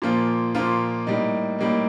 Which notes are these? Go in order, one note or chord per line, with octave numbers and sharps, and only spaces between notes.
A#2 F3 A#3 F4
A#2 F3 A#3 F4
A2 G3 A#3 D#4
A2 G3 A#3 D#4